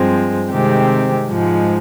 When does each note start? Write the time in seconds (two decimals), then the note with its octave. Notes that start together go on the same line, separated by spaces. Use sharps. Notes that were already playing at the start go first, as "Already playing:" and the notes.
Already playing: G2 F3 G#3 C4
0.50 C3 D#3 G#3 C4 G4
1.29 G#2 F3 G#3